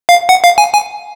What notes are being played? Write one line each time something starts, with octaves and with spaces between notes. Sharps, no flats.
F5
F#5
F5
G#5
G#5